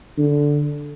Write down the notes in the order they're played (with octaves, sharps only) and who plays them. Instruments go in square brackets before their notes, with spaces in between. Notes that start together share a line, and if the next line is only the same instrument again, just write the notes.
[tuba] D3